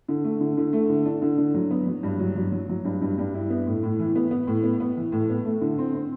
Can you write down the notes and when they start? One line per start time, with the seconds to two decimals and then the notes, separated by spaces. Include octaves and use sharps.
0.08 D3
0.24 A3
0.41 D3
0.57 D3
0.73 A3
0.89 D3
1.06 D4
1.22 D3
1.38 D3
1.54 F#3
1.71 B3
1.87 F#3
2.03 G2
2.19 F#3
2.36 F#3
2.52 F#3
2.69 F#3
2.85 G2
3.02 G2
3.18 G2
3.34 E4
3.50 B3
3.67 A2
3.83 A2
3.99 E3
4.15 B3
4.31 B3
4.47 A2
4.63 B3
4.80 B3
4.97 E3
5.12 A2
5.30 B3
5.45 A3
5.61 D3
5.78 C4
5.95 C4